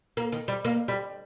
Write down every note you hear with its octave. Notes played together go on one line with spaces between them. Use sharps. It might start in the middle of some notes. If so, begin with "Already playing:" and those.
A#3
D#3
G3
A#3
G3